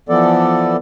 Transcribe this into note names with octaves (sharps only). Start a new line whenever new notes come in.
E3 F3 B3 A4 D5